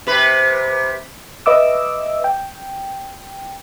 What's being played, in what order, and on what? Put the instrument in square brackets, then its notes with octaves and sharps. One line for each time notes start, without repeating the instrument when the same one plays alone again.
[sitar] C3 B4
[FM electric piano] B4 D#5 E5 D6 E6
G5